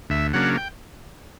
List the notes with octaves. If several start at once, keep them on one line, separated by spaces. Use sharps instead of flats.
D2 E5
C#3 F#3 A#3 D4 F#5
G5